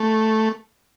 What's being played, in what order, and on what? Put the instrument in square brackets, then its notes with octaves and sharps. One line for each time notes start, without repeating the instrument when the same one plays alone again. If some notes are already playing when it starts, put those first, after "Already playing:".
Already playing: [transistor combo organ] A3